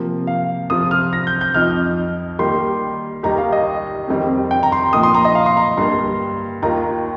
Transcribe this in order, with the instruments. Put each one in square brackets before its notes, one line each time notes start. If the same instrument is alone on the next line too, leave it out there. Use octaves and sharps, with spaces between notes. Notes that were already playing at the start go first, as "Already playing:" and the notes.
Already playing: [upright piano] C3 F3 A#3
[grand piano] F5
[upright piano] C3 F3 C4 F4 [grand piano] D#6
[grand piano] F6
A#6
G6
G6
[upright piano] F2 F3 D#4 [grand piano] F6
[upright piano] D#3 G3 A#3 G4 [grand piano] C6
[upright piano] D#2 D#3 G3 D#4 G4 [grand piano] A#5
[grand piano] F5
D#5
[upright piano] F2 D#3 G3 C4
[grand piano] G5
A#5
C6
[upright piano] A#2 F3 A#3 D#4 [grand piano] D#6
[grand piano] C6
A#5
D#5
F5
C6
A#5
[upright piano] G2 G3 A#3 [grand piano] C6
[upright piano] D#2 D#3 A#3 F4 [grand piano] A#5